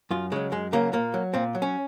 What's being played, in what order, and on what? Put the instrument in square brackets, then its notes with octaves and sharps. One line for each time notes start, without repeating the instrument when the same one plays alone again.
[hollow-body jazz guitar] F#2 F4
C#3 F#3 G#3
F#2 G#3
C#3 F#3 A#3
A#2 A#3
F#3
A#2 C4
F#3
C#4